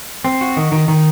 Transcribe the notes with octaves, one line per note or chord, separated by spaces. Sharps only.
C4
F#4
D#3
D#3
D#3